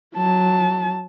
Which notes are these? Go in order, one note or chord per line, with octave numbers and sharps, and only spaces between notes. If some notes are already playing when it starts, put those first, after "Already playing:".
F#3 A5